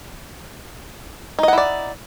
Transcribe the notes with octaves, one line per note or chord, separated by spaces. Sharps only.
D#4 E4 D5 D#5 F#5